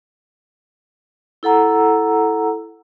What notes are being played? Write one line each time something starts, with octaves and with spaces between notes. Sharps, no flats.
E4 A4 F#5 A#5 E6